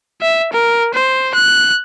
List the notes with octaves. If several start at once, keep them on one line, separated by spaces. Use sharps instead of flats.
E5
A#4
C5
F#6